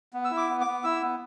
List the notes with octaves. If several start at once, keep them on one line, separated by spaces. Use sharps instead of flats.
B3
E6
E4
D6
B3
D6
B3
E4 E6
B3